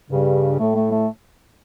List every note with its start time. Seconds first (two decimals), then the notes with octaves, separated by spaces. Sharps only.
0.10 G2 C#3
0.59 A2 A3
0.76 A3
0.91 A3